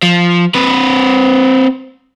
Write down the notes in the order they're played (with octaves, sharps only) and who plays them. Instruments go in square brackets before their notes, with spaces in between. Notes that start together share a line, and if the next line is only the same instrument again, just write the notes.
[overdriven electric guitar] F3
C4 B4